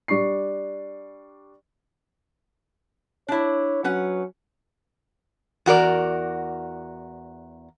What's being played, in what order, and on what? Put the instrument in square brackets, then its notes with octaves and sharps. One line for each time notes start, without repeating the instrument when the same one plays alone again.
[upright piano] G3 D4 C#6 C7
[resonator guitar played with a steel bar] D4 E4 [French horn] C#5
[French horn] F#3 [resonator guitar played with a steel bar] C#4 B4 F#5
[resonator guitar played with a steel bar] E2 F#4 A#4 D5